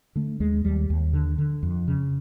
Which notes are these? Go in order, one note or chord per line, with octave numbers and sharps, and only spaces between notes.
D3 A3
D#2 G#3
D#2 G3
D#2
D3
D3
F2
C#3